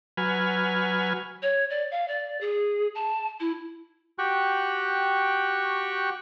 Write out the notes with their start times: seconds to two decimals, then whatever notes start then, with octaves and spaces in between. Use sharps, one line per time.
0.17 F#3 B4 G#5 F6
1.42 C#5
1.70 D5
1.91 F5
2.08 D5
2.41 G#4
2.95 A5
3.40 E4
4.19 F#4 G4 G5 C#6 F#6